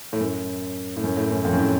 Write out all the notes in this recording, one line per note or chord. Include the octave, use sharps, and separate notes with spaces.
A2
F#2
A2
F#2
A2
F#2
F2
F#2
A2